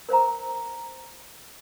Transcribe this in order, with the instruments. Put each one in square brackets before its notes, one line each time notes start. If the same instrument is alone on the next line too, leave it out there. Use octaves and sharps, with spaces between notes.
[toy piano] A#4 C5 F5 A#5